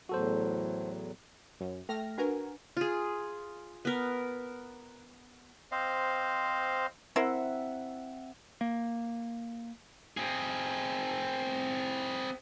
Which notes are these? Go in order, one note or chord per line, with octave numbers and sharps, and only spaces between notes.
E2 A2 F#3 F#4 A4 C5
F#2
A3 G5 F6 A#6
D4 F#4 A#4 B4 G#5
F4 G#4
B3 A#4
C4 C5 D#5 F5
C4 E4 A#4 C5 E5 F#5
A#3
C4 G#4